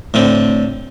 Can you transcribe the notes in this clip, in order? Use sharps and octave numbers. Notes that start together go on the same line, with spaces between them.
A2 D3 C4